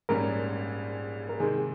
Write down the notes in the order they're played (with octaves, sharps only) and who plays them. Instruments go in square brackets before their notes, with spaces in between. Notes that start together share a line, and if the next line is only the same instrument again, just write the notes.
[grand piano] A#1 G#2 G3 C#4 [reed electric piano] A#4
[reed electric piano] A#4
[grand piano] C3 D#3 G#3 C4 [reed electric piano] G#4